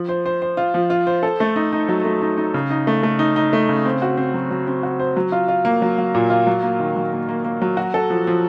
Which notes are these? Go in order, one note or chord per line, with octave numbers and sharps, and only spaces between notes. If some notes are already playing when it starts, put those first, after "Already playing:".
Already playing: F3
C5
C5
C5
F4
F3
F4
C5
A4
A3
D#4
D#4
F#3
A3
D#4
D#4
C#3
D#4
A3
A3
D#4
D#4
A3
C#3
C4
F#4
C4
F#3
F#3
C4
F#4
C5
F#3
F4
F4
A#3
F#3
F#3
A#2
F4
F#3
A#3
D#3
F#3
A#3
A#3
A#3
F#3
F#4
A4
F3
F3